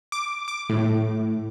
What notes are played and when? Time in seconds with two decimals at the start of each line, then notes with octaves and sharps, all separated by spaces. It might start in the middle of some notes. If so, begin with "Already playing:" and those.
0.12 D6
0.48 D6
0.69 A2